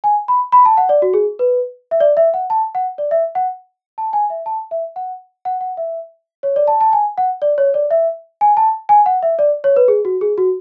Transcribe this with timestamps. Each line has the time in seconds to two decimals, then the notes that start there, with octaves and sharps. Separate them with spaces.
0.04 G#5
0.28 B5
0.52 B5
0.65 A5
0.77 F#5
0.89 D5
1.02 F#4
1.13 G#4
1.39 B4
1.91 E5
2.01 D5
2.17 E5
2.34 F#5
2.50 A5
2.75 F#5
2.98 D5
3.11 E5
3.35 F#5
3.98 A5
4.13 G#5
4.30 E5
4.46 A5
4.71 E5
4.96 F#5
5.45 F#5
5.61 F#5
5.77 E5
6.43 C#5
6.56 D5
6.67 A5
6.81 A5
6.93 G#5
7.18 F#5
7.42 D5
7.58 C#5
7.74 D5
7.91 E5
8.41 G#5
8.57 A5
8.89 G#5
9.06 F#5
9.23 E5
9.39 D5
9.64 C#5
9.76 B4
9.88 G#4
10.05 F#4
10.21 G#4
10.38 F#4